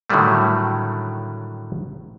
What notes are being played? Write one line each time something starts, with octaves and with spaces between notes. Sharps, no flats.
A2 D3 D#3 F#3 G3 A3